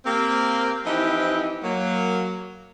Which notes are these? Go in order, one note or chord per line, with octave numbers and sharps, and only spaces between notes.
A#3 C4 G4
E3 F3 C4 D#4 E4 G4
F#3 A#3